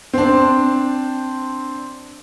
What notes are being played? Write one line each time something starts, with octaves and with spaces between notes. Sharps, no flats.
C4 D4